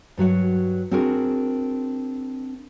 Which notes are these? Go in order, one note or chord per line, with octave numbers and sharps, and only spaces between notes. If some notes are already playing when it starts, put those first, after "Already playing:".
G2 F#3 F#4 F#5
C4 D4 F#4 G#4 A#4